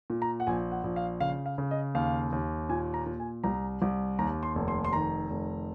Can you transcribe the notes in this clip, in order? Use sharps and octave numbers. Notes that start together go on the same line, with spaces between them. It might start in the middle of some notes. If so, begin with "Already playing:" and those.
A#2
A#5
F#5
A#1 G#5
F#5
A#1
F5
C#3 F5
F5
C#3
D#5
D#2 F5
D#2
A#2 G#5
A#5
A#2
G#5
C2 A#5
C2
D#2 A#5
C6
F1
C6
C6
D#3 A#5
F1